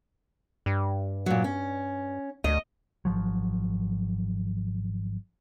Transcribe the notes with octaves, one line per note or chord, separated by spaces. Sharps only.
G2
A#2 F#3
C#4
D2 D#5
G#1 F3 F#3